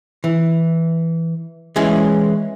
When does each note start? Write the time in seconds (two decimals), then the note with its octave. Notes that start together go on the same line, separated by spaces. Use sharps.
0.24 E3
1.76 E3 G#3 C#4